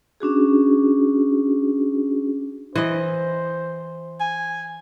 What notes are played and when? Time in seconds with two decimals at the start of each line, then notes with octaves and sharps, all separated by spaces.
0.20 C#4 D4 F#4 G#4
2.75 E3 C5 D#5
4.20 G#5